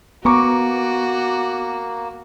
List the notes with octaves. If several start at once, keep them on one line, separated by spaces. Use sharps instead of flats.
A#3 B3 F#4 A#5 C#6 D6